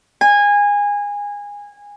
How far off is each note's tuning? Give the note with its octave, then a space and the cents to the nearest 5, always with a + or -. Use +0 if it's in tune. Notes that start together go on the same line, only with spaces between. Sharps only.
G#5 -20